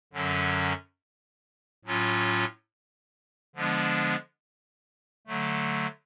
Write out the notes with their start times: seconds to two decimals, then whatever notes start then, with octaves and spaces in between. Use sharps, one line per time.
0.13 F#2 D3 F#3 C#4
1.85 A2 F#3 C#4 F4
3.56 D3 F3 G#3 B3 D4
5.27 D3 F#3 A3